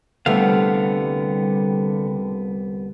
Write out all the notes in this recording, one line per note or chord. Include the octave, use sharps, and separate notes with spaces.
C2 D3 G3 A3 B3 F5